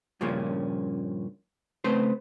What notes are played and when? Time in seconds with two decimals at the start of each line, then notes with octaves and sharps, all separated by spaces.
0.21 G2 A#2 C#3 F3 A#3 C#4
1.84 C#3 A3 C4 B4 C5